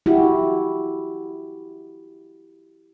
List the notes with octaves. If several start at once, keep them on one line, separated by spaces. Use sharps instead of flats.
E4 F#4 G4